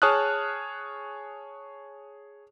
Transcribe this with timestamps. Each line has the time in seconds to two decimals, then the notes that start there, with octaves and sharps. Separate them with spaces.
0.02 G#4 C#5 A5 D#6 F6 F#6